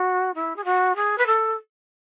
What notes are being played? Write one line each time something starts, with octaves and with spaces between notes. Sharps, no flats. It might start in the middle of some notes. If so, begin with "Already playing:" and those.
Already playing: F#4
E4
G#4
F#4
G#4
B4
A4